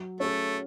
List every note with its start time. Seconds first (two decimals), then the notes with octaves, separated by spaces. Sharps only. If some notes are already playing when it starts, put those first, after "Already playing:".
Already playing: F#3
0.20 A3 C#4 G#4